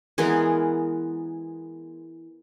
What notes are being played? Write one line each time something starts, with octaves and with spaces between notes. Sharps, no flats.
E3 G#3 B3 A#4